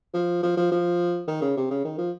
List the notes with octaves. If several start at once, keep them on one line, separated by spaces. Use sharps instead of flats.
F3
F3
F3
F3
D#3
C#3
C3
C#3
D#3
F3